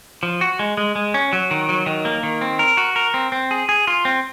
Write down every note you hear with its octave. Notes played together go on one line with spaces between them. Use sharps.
F3
F#4
G#3
G#3
G#3
C#4
F#3
D#3
F#3
D#3
A#3
D#3
C4
A#4
F#4
A#4
C4
C4
G#4
G#4
F4
C4